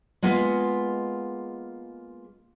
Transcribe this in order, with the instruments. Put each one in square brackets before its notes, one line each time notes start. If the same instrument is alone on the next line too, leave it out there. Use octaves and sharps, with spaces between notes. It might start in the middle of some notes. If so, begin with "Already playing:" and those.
[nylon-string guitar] G#3 A#3 B3 F4 G#4